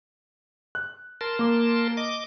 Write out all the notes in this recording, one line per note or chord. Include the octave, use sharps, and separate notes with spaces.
F#6
A#4 A5 C6
A#3 D6
D#5 D6